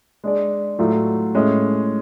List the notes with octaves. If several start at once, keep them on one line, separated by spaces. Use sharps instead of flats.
G#3 D4 G#4 D5
A2 F#3 A3 F4
A2 G#3 C#4